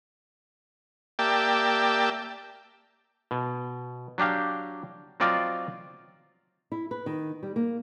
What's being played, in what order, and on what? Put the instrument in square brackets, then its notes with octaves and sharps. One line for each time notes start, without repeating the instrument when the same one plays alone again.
[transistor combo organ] A#3 G4 D5 E5 G5 A5
[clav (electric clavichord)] B2
F#3 D4 G4 F5
F#3 C4 F4 D5 D#5 F5
[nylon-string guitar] E4
B4
D#3
G3
A#3